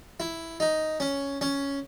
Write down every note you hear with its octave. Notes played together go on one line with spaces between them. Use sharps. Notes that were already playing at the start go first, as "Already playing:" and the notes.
E4
D#4
C#4
C#4